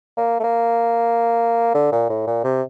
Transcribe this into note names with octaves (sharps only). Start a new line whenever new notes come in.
A#3
A3
A#3
D3
A#2
A2
A#2
C3